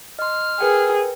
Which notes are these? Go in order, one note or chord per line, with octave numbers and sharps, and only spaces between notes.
D#5 C6 F6
G#4 A#4 B4 G5